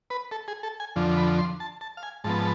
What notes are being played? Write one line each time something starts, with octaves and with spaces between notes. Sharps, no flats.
B4
A4
G#4
A4
G#5
F2 D3 F3
B5
C6
A5
A5
F5
G#5
G#2 F3 B3 A5